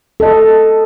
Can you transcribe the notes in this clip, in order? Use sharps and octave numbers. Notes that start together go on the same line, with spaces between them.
A4 D#5